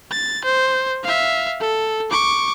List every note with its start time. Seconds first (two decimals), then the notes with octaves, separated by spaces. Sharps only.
0.11 A6
0.44 C5
1.03 E5 F5
1.60 A4
2.10 C#6 D6